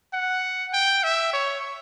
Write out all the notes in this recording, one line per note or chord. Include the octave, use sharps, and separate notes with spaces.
F#5
G5
E5
C#5